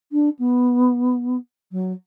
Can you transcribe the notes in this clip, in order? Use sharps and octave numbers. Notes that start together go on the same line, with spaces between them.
D4
B3
F#3